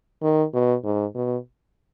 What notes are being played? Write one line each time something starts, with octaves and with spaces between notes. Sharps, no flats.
D#3
B2
G#2
B2